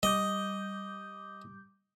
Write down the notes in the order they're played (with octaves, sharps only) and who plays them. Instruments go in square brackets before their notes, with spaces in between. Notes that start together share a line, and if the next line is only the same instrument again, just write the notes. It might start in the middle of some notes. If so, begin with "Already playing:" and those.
[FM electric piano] G3 D6 G6 [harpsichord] D#5